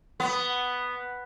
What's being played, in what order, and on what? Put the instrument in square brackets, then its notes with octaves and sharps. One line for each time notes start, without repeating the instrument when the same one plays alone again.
[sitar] B3